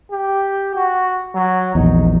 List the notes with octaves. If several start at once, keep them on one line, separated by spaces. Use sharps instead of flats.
G4
F#4
F#3
A#1 E2 D#4